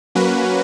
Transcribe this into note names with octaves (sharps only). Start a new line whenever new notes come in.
F#3 A#3 C#4 F#4 B4